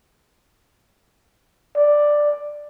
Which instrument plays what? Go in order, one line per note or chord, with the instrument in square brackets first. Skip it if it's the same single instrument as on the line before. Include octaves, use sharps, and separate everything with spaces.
[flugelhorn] D5